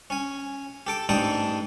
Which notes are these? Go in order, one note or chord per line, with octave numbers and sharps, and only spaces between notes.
C#4 G#5
G4 A4 D6
A1 G#2 D4 A4 G5 D#6